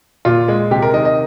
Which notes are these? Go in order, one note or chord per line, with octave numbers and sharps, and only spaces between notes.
A#2 F4
G#3
C3 G4
A#4
D#3 D#5
D#5